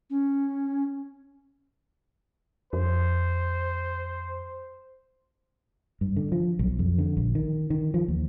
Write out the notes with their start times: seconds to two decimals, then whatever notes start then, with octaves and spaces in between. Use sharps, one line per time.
0.10 C#4
2.73 F2 C5
6.01 G2
6.16 D3
6.32 F3
6.59 B1
6.79 F2
6.98 D3
7.17 A#1
7.35 D#3
7.70 D#3
7.94 F3
8.08 D#2